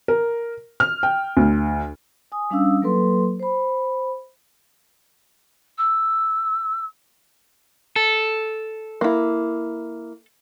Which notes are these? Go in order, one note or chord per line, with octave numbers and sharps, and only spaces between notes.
A#4
F6
G5
D2
G#5 D#6
G3 C#4 D4 F5 D#6 E6
F#3 A#3 A4 B4 C6
C5 B5
E6
A4
A#3 E4